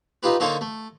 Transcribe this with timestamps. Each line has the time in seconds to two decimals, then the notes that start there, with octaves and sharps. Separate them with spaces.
0.23 D#4 F4 G4 B4
0.40 D3 A#3 D#4 A4 C5 C#5
0.61 A3